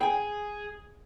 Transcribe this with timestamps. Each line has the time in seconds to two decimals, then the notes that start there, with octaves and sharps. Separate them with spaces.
0.01 G#4 G5 G#5